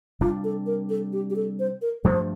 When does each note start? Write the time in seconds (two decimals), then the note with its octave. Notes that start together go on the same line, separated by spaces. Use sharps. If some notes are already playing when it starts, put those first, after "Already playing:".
0.21 C3 G3 D4 F4
0.44 A4
0.66 A#4
0.90 A4
1.13 G4
1.30 G4
1.36 A4
1.59 C5
1.82 A#4
2.04 G2 F3 A3 D4 C5